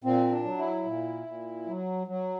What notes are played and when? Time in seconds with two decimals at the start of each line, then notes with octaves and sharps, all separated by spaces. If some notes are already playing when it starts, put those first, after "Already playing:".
0.04 A#2 C4
0.32 D4
0.45 F#3
0.58 E4
0.86 A#2
1.26 A#2
1.67 F#3
2.07 F#3